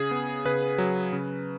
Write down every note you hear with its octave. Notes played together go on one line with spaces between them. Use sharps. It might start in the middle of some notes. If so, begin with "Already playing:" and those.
Already playing: C#3 G#4
B3
C#3 B4
F#3
C#3